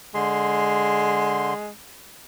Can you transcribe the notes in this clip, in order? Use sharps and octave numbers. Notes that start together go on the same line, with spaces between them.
D3 G#3 C6